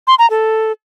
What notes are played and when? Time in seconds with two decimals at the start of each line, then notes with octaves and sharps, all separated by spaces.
0.07 C6
0.19 A#5
0.30 A4